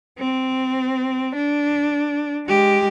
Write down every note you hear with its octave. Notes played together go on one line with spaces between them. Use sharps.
C4
D4
G#3 G4